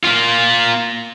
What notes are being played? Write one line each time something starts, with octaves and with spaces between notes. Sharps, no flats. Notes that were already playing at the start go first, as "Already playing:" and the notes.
A#3 F4